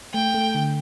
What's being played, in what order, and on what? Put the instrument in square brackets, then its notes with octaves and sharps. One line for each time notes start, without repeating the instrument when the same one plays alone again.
[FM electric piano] A3 [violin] G5
[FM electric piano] A3
D3